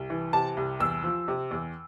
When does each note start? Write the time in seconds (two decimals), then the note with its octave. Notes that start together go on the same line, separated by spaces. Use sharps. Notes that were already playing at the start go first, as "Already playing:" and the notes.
Already playing: C2
0.10 E3
0.33 C3 A5
0.57 C2
0.80 E2 E6
1.04 F3
1.28 C3
1.51 E2